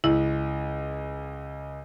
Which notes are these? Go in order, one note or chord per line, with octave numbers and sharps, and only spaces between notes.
C#2 E4